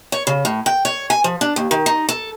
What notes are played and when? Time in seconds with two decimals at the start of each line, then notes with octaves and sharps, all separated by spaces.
0.12 C#5
0.27 C#3
0.45 A2
0.66 G5
0.85 C#5
1.10 G#5
1.24 F3
1.41 D4
1.56 D#2
1.71 D#3
1.86 D#4
2.09 A4